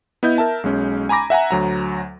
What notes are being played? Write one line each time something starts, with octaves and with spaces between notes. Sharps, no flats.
B3 E4 D#5 G6
A#4 E5 A5
B1 G#3 C#4
G#5 A#5 B5 D6 A#6
E5 F#5 G#5 A#5
D2 F#3 A#5